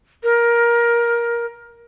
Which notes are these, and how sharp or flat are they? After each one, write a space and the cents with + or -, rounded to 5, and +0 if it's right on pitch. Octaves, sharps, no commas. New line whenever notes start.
A#4 +15